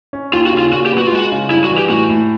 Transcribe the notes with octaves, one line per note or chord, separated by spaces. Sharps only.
C#4
D#2 F4
F#4
C#3
F4
A#2 F#4
G4
B3
F#4
F4
G#3 F#4
C#3
G2 E4
F#4
E3
G4
A2 F#4
A2